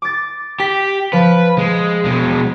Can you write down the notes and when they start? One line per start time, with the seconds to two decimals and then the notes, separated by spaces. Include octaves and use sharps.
0.02 D6 A6
0.60 G4 B6
1.13 F3 B4
1.58 G#3
2.05 B2 G#3